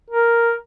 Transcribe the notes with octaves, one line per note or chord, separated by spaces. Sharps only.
A#4